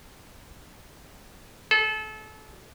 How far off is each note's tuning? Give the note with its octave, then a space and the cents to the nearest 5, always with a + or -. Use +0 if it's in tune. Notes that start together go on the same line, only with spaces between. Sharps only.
A4 -30